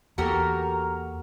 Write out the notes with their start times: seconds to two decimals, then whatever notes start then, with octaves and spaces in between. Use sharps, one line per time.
0.18 E2 A#3 F#4 G4 A4 A#4 A#5